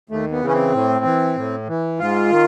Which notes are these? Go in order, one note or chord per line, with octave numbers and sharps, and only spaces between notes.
D#2 A3
B3
C#3 E3
C#4
C4
A2
E3
A2
E3
G#2 F4
D#3